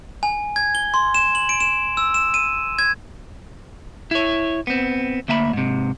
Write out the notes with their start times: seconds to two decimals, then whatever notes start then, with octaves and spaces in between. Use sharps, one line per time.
0.23 G#5
0.56 G#6
0.75 G7
0.94 C6
1.14 E7
1.35 F#7
1.49 D7
1.60 E7
1.97 E6
2.14 E7
2.34 D#7
2.79 G#6
4.11 E4 C#5
4.67 B3 C4
5.28 D2 A#3 E5 G#5 B5
5.53 G#2 C3